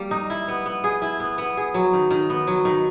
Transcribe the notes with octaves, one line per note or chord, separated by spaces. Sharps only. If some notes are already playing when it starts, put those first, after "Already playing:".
Already playing: G3 A#3
D#4
E4
B3
B3
G#4
E4
B3
B3
G#4
F#3
D#3
D#3
B3
F#3
D#3